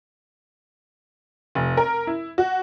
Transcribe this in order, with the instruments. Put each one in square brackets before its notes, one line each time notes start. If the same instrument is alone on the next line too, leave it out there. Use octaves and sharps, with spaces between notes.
[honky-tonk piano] F1
A#4
E4
F#4